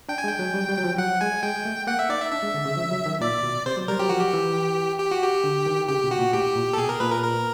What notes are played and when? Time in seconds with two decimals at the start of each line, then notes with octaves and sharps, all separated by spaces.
0.09 D4 G5
0.18 G#5
0.24 G#3
0.27 G5
0.39 F#3
0.54 G3
0.69 G3
0.78 F#3
0.84 F3
0.98 F#3 F#5
1.21 G#3 G#5
1.43 G#3 G5
1.65 A3
1.87 A#3 F#5
1.99 E5
2.09 D#4 D5
2.21 E5
2.32 D4 E5
2.43 G#3
2.54 D3
2.66 C#3
2.77 F3
2.91 F#3
3.06 D#3
3.21 A#2 D5
3.43 B2
3.66 C3 C5
3.77 F#3
3.88 G3 A#4
3.99 F#3 G4
4.09 F3 F#4
4.20 G4
4.33 E3
5.00 G4
5.11 F#4
5.23 G4
5.44 D3
5.66 D#3
5.88 C#3 G4
6.04 B2
6.11 F#4
6.19 A#2
6.33 A2 G4
6.56 A#2
6.73 A4
6.78 B2 G#4
6.89 A#4
7.00 A#2 B4
7.11 A#4
7.23 A#4